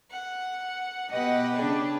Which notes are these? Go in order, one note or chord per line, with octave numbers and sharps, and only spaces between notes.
F#5
B2 G4 B4 D#5 F#5
C#3 D4 G#4